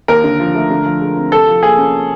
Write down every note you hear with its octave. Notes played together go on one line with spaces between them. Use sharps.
D#2 A#4
D3
F3
A3
D3
F3
G#3
C4
C3 A4
F3
A#3 G#4
C#4